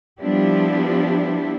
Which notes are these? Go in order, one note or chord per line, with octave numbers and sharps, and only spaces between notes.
F3 G3 B3 D4 E4 G4